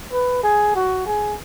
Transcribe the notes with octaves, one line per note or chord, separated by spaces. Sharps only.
B4
G#4
F#4
G#4